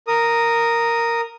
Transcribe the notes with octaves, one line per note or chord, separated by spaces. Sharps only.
A#4 D#6